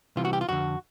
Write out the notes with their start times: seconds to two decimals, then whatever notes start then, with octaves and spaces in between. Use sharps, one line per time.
0.16 C2 C3 E3 F4
0.25 F#4
0.33 G4
0.41 F4
0.49 F2 D3 F#4